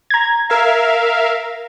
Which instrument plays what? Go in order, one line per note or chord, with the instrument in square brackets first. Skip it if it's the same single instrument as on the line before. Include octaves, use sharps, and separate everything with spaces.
[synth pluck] A#5 G#6
[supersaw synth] A#4 E5 F5